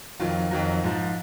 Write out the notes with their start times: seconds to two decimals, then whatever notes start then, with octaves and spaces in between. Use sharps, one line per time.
0.20 F2 D#3 F#3 F4
0.51 F2 D#3 F#3
0.84 G#2 F3